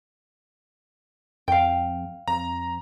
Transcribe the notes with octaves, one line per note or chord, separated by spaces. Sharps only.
F2 F5 G5
F2 A#5